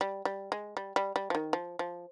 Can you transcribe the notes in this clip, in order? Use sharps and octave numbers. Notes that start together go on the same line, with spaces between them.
G3
G3
G#3
G3
G3
G3
F3
D#3
F3
F3